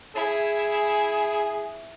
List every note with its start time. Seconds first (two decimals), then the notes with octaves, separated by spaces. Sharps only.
0.16 E4 G#4